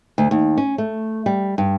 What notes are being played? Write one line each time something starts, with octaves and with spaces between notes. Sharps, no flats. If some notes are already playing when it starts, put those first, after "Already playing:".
D2
D#2
C#4
A3
G3
G2